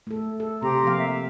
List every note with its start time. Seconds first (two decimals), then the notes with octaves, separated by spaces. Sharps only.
0.07 A3 A4
0.40 A4
0.62 C3 C4 G4 A#5 C6
0.84 F3 A#3 F5
0.98 E5